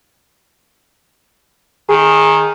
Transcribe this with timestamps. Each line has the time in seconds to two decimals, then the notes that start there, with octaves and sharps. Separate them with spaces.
1.89 D#3 G#4